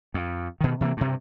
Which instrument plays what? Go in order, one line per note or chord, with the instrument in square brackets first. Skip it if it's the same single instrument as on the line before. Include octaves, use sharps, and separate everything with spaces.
[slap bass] F2
B2 D#3
C3 E3 F3 A#3
G2 C3